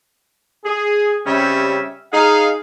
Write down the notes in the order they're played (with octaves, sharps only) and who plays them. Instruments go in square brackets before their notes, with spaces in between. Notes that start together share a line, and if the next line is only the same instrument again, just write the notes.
[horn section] G#4
C#3 G3 C4 C#4 G4 E5
D#4 G#4 F5